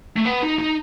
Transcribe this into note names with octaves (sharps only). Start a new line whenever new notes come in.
A3
B3
D#4
D#4